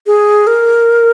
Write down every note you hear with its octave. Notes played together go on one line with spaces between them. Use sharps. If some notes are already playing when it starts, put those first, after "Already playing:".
G#4
A#4